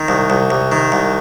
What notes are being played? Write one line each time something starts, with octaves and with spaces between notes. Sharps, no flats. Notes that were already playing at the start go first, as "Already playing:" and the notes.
Already playing: D#3
C2
C2
C2
D#3
C2